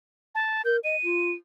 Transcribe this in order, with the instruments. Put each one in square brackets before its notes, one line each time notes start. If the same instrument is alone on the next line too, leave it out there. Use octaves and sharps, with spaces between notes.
[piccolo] A5
[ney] A#4 [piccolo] G6
[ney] D#5 [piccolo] D#7
[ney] F4